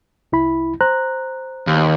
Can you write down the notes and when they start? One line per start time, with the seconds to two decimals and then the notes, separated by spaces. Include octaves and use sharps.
0.32 C2 E4 B5
0.81 C5 A#5 F#6
1.67 D#2